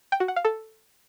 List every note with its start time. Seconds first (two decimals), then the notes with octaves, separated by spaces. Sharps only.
0.12 G5
0.20 F#4
0.28 F#5
0.36 F5
0.45 A4